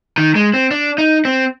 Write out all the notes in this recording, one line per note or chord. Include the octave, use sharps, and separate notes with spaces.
D#3
G#3
C4
D4
D#4
C4